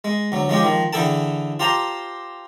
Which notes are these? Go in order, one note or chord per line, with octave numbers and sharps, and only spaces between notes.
G#3
D2 F#3
F3 G#3 C#4 G4
D#3 F3
D3 E3 G#4 A4 G5 A5
F4 G4 C5 A5 A#5 C6